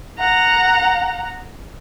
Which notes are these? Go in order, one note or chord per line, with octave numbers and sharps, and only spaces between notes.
F#5 A#5